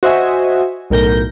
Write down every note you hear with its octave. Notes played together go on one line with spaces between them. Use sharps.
F#4 C5 D#5 E5 G#5
B1 A2 A#4 G6 A#6